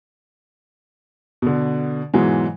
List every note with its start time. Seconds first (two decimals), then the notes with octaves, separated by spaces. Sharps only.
1.42 B2 D3
2.14 G#2 B2 E3 F#3 G#3